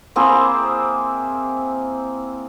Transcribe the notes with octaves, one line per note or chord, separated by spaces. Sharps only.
A#3 C4 E4 G#4